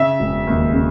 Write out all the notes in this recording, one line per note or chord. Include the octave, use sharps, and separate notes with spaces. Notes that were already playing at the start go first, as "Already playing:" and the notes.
Already playing: C#3 E5
E1
D#2
C#3